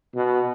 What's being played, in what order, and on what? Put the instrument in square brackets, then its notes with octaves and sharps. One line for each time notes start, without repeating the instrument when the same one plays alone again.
[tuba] B2